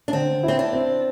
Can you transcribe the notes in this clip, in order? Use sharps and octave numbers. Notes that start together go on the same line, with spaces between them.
D4
D3 C4
C4 E4
D4
C4